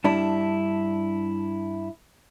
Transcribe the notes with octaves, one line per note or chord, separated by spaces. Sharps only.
G2 D4 E4